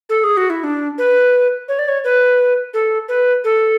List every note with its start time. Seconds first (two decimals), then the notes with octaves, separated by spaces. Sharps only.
0.09 A4
0.24 G#4
0.37 F#4
0.50 E4
0.64 D4
0.98 B4
1.68 C#5
1.79 D5
1.88 C#5
2.04 B4
2.74 A4
3.09 B4
3.44 A4